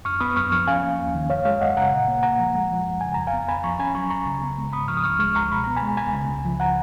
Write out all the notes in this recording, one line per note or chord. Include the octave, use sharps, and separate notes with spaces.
F#2 C#6 F6
B3 B5 D#6
F#2 C#6 F6
F3 C#6 F6
C#4 F5 G#5
A#3
D#2
D#3
F#2 C#5 F5
G#3 C#5 F5
F#2 D#5 F#5
C#3 F#5 A#5
A#2
A#3
A#2 F#5 A#5
F3
G#3
F3
F#2
C#3 G#5
F2 A#5
F5 G#5
B3
F2 G#5 B5
F3 A#5 C#6
C#4 G#5 B5
F#3 A#5 C#6
C#2 A#5 C#6
C#3
B3
G#3
G#2 B5 D#6
F3 C#6 F6
D#6
C#2 C#6 F6
G#3 C#6 F6
C#2 A#5 C#6
B2 B5
B3 A#5
G#5 B5
G#3
C#2 G#5 B5
C#3
C#2
F3
F#5 A#5